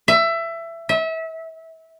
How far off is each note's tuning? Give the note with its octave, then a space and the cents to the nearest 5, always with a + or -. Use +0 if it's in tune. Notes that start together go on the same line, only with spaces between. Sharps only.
E5 +20
E5 -30